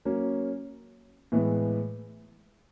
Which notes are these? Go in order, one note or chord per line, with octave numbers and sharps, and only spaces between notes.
F#3 A#3 C#4
A2 E3 G#3 B3